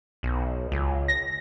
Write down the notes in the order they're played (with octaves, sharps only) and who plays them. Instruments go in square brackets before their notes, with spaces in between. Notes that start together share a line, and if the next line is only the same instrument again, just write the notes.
[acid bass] B1
C#2
[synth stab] A#6